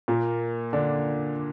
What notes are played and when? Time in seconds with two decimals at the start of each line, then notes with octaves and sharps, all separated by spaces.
0.08 A#2 A#3
0.73 D3 D4